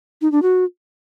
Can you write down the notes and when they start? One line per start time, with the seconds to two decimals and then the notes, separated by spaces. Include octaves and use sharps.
0.21 D#4
0.32 D4
0.42 F#4